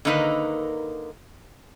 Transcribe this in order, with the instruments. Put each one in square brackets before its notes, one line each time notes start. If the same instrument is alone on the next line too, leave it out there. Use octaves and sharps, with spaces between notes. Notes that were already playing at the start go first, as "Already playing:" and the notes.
[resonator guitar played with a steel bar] D3 D#3 A#3 D#4 A#4 B4